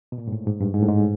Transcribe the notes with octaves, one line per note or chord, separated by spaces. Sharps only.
B2
A#2
G#2
A2
G#2
G2
G#2
A2
G#2